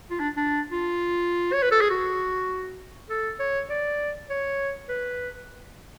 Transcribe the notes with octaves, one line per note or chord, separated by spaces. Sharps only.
F4
D4
D4
F4
C#5
B4
A4
G#4
F#4
A4
C#5
D5
C#5
B4